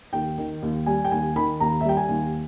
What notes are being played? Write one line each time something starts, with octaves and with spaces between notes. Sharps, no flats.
D#2 G5
D#3
D#2
G3 G#5
G5
D#2 G#5
D#3 B5
D#2 A#5
E5
G3 G5
G#5
D#2